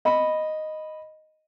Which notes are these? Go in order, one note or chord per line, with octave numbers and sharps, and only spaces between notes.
D#5 B5